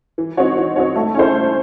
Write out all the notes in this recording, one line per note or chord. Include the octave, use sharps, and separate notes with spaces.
E3
C4 D#4 F#4 C#5
E3
C4 D#4 F#4 C#5
A3
C#4 E4 C5
A3